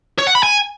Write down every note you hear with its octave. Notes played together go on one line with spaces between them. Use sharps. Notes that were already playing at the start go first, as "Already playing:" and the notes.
C#5
F#5
B5
G#5